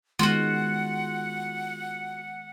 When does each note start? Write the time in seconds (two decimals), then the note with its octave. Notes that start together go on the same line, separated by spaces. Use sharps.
0.19 D#3 G#3 B3 F4 F#4 F#5